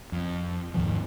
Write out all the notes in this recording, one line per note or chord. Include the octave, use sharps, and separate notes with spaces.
F2
D#2 G#2 D#3 F3